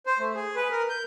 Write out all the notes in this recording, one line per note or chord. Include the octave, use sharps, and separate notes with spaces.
C5
A3
G#4
B4
A#4
G6